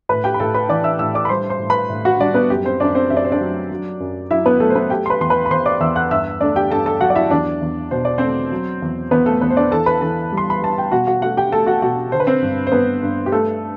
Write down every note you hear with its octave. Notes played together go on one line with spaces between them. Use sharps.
A2 B4 B5
G4 G5
B5
A2 A4 A5
B4 B5
E3 D5 D6
E5 E6
A2 E5 E6
D5 D6
B5
G3 C5 C6
C5 C6
A2
B4 B5
A2
F#4 F#5
G3 D4 D5
B3 B4
F#2 G4
C4 C5
F#2 D4 D5
C4 C5
F#2 E5
D5
C5
D4 D5
F#3
F#3
F#2
F#3 E4 E5
B3 B4
F#3 A3 A4
C5
B3 B4
A3 G4 G5
C6
B4 B5
E2 C6
B4 B5
B5
E2 C5 C6
D5 D6
E2 E5 E6
F#5 F#6
G2 E5 E6
A3 D4 D5
G4 G5
G2 A4 A5
A4 A5
F#3 F#4 F#5
D5
E4 E5
E2 D4 D5
E2
B2 C5
D5
A3 C4 C5
F#3
E2
E2 B3 B4
A3 A4
E2 B3 B4
C5
D4 D5
E3 A4 A5
B4 B5
E3 A4 A5
G3
C6
B5
G3 A5
G5
B2 F#4 F#5
F#4 F#5
A3 F#4 F#5
G4 G5
A3 A4 A5
F#4 F#5
B2 F#4 F#5
D3 C5
B4
C4 C5
G2
C5
G2 B3 B4
G2
G4
A3 A4